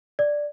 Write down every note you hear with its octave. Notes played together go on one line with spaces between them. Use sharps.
D5